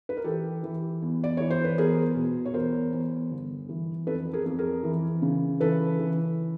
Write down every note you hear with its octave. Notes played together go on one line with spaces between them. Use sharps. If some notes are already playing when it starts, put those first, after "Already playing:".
B4
A#4
E3 G4 A4
E3
E2
D5
E3 C#5
C5
B4
E2 G#4 A#4
B2
C#5
E2 A#4 C5
E2
G1
E3
F2 A4 B4
G#4 A#4
F2
G#4 A#4
E3
C#3
E3 A4 B4
E3